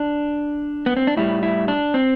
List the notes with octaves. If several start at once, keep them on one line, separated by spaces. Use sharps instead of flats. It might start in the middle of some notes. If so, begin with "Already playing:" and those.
Already playing: D4
B3
C4
D4
A2 G3 E4
E4
D4
C4